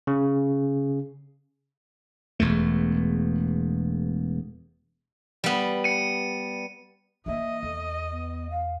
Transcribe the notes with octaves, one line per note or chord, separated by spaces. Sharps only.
C#3
E1 E2 A3
G3 B3
C#7 D#7
E3 A#3 D#5 E5
E2 A4
B3
F5